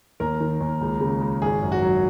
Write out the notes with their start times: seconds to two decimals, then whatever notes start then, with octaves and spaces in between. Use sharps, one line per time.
0.20 D#2 A#4
0.40 D#3
0.61 D#2
0.81 C#2
1.01 C#3
1.21 G#3
1.42 G#1 G#4
1.62 F#2
1.72 F#4
1.82 F#3